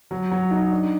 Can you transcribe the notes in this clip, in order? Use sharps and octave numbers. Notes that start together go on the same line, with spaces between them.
F#3
F#3
D#4
D4